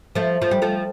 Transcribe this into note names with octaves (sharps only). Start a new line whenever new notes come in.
F3 A3
F3
G3
F3 A3